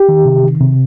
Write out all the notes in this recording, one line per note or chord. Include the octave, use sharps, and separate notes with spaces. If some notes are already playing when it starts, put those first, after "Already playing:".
Already playing: G4
D#3
C3
D#3
C3